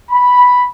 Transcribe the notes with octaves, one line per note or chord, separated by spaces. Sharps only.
B5